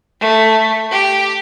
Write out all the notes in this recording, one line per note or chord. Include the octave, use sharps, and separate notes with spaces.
A3
G4